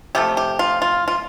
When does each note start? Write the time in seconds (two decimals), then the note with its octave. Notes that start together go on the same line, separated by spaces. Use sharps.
0.15 C3 F3 A3 G4
0.37 G4
0.59 F4
0.82 F4
1.08 F4